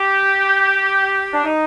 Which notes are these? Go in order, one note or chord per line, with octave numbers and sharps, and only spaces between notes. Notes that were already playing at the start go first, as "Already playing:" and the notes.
Already playing: G4
D4
D#4